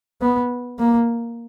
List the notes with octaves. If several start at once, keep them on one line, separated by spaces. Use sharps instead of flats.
B3
A#3